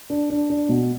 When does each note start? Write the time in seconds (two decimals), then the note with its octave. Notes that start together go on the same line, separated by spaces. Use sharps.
0.10 D4
0.30 D4
0.50 D4
0.69 B2